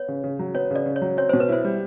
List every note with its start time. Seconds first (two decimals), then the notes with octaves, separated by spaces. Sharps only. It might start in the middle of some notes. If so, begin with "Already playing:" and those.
Already playing: B3 C#5
0.08 C#3
0.24 C#3
0.39 F#3
0.54 B3 C#5
0.71 C#3 D5
0.86 C#3
0.96 C#5
1.02 F#3
1.17 C4 C#5
1.29 B2 C5
1.40 B4
1.49 E4 C5
1.64 G3